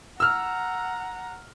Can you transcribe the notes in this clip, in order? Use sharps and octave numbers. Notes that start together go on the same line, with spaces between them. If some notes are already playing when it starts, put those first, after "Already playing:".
F#5 A#5 E6 F6